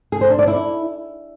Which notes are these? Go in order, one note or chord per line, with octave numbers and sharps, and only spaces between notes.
G#4
C5
D4
D5
E4